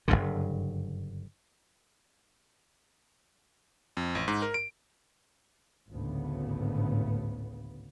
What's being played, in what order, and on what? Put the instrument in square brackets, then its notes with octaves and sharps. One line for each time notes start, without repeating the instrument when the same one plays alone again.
[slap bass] F#1 B1 G2 D3
[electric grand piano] F2
A1
G#2
A#4
D7
[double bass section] G#1 D2 A2 C#3 B3